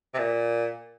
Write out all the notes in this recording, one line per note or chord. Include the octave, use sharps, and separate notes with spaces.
C3
A#2